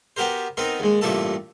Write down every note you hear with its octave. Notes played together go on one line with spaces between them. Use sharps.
B3 F#4 G4 A#4 C5
B3 C4 D#4 A#4
D#2 G#3
A1 G2 A#2 A3 A4 A5